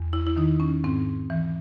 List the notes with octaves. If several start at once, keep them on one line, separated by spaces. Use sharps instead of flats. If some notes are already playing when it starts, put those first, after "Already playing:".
Already playing: E2
E4
E4
D#3 D#4
C#4
G#2 C4
E3